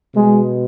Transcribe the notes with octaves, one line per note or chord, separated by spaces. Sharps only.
B2 G#3